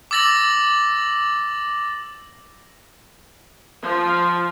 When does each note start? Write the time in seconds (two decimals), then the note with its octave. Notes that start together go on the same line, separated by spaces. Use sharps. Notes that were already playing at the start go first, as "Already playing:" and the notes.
0.11 D6 E6 A6 A#6 F#7
3.81 F3